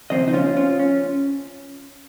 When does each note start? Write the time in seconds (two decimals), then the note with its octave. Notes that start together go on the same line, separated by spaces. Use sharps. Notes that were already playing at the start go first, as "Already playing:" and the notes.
0.10 D#2 C#3 F3 C4 C5 D#5
0.28 D#4
0.33 C#4 F4
0.57 C#4 F4
0.79 C#4